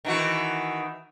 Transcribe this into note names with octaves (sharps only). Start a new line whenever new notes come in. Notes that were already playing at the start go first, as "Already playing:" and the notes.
D#3 E3 F#4